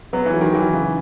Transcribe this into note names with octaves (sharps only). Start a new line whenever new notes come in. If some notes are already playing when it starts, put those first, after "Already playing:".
F#3 B3
E3
F#3
D#3
E3 F#3
C#3